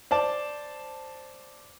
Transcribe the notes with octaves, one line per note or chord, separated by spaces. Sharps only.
C5 D5 A5